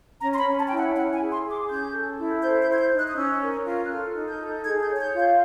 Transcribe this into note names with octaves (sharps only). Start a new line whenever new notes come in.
C#4 A#5
C6
B5
C#4
A5
E4 G5
F#5
E4 F#5
G#5
G#4
C6
G#4
D6
C#4 G6
A4
E4
C5 G6
G6
C5
G#6
G6
D#4
F#6
D#6
C#4 E6
A#4
F4
F#6
A4 F6
D#4
G6
A4
G#4 G#6
G6
C#5
G#6
G6
F4
G6